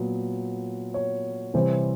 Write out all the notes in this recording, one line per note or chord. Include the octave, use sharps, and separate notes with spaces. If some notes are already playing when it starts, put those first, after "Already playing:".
Already playing: A#2 F#3 B3
C#5
C3 E3 G3 C4